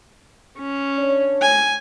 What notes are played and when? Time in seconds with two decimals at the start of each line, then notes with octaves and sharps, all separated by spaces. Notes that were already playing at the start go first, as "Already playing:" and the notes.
0.59 C#4
0.98 D4 C#5
1.42 G#5